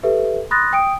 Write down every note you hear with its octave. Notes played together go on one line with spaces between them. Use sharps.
G4 A4 B4 E5
B5 C6 D#6 F#6 A6 A#6
G5 D#6 D7